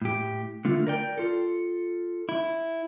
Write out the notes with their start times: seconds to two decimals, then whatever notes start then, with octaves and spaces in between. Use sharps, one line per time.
0.02 A2 G4
0.65 D3 A3 F4
0.87 A#4 D5 G5
1.18 F4 A4
2.29 E4